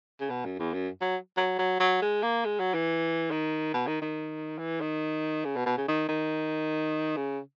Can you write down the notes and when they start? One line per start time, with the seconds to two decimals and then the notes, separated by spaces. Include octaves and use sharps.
0.20 C#3
0.30 B2
0.45 F#2
0.59 E2
0.73 F#2
1.01 F#3
1.37 F#3
1.59 F#3
1.80 F#3
2.02 G#3
2.23 A#3
2.45 G#3
2.59 F#3
2.74 E3
3.31 D#3
3.74 B2
3.87 D#3
4.01 D#3
4.58 E3
4.81 D#3
5.45 C#3
5.56 B2
5.66 B2
5.77 C#3
5.88 D#3
6.08 D#3
7.16 C#3